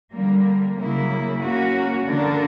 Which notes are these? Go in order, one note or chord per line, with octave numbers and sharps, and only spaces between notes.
D3 G3 A#3
C#3 F#3 A#3 E4
A#3 C#4 F#4
D3 A#3 D4 A#4